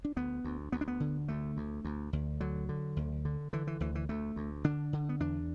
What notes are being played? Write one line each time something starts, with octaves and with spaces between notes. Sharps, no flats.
D4
D2 B3
D2
D2 B3
D4
B3
D3
D2 A3
D2
D2
D2
D3 F#3
D3
D2
D3
D3 E3
E3
D2 E3
E3
D2 A3
D2
D3 D4
D3
B3
E2 D4